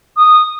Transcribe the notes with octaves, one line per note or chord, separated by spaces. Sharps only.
D#6